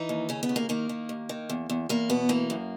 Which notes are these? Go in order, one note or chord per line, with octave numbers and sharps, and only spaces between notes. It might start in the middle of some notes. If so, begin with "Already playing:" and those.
Already playing: E3 D#4
D#2
C#3 C#4
B3
D#2
A#3
D#3 A#3
D#3
D#2
D#3
E2
E2
E2 A#3
B2 B3
E3 A#3
F#2